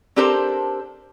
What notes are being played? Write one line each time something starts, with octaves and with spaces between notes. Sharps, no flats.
C4 D4 G4 A4 A#4 C5